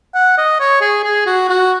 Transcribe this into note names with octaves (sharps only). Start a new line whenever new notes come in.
F#5
D#5
C#5
G#4
G#4
F#4
F#4